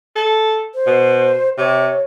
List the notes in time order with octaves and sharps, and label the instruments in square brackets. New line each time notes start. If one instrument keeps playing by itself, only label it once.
[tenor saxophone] A4
[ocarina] C5
[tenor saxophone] B2
[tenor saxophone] C3 [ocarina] C#5